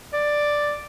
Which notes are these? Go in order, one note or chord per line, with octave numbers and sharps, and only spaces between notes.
D5